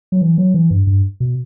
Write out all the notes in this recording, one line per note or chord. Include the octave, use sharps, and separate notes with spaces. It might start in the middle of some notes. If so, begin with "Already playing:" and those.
F#3
E3
F#3
E3
G2
G2
B2